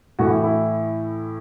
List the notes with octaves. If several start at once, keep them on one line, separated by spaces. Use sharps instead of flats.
A2 E3 F#4
E4
E4